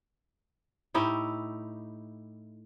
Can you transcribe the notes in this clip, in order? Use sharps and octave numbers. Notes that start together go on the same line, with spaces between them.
A2 D#4 E4 G4